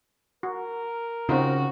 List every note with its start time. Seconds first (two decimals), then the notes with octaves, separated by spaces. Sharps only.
0.43 F#4 A#4
1.29 C#3 C4 D#4 F4 F#4